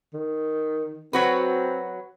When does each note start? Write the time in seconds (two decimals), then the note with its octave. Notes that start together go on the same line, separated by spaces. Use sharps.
0.13 D#3
1.13 F#3 C4 F#4 B4